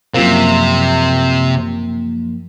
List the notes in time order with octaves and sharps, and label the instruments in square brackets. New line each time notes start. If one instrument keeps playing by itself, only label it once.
[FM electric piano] F#2 F3 A#3 [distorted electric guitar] C3